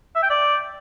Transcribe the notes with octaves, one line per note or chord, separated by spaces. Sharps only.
E5
G5
D5